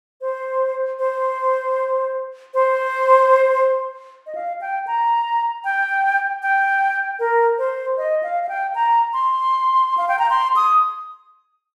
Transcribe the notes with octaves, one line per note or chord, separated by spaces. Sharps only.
C5
C5
C5
D#5
F5
G5
A#5
G5
G5
A#4
C5
D#5
F5
F5
G5
A#5
C6
F5
G5
A#5
C6
D#6